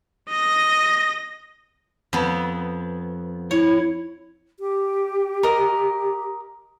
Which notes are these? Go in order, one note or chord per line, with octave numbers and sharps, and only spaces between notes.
D#5 A#6
F2 B3
E4 C#5
G4
A#4 D#5